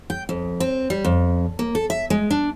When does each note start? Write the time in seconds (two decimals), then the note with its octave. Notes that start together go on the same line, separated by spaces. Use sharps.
0.10 G5
0.29 F2
0.60 C4
0.90 G3
1.04 F2
1.59 A#3
1.75 A4
1.90 E5
2.10 G#3
2.30 D4